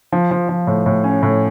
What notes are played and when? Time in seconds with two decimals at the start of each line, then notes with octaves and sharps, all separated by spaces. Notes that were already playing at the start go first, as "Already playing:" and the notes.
0.12 F3
0.31 F3
0.49 F3
0.67 A2
0.86 A2
1.04 C#4
1.23 A2